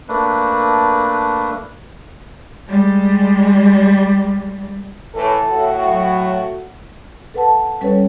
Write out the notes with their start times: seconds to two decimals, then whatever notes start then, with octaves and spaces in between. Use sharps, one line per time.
0.08 A3 A#3 D4 B4
2.68 G3 G#3
5.15 A2 E3 A4
5.48 A2 F#4
5.87 F#3
7.34 A4 B4 F#5 A5
7.81 G3 C#4 A4 B4 C#5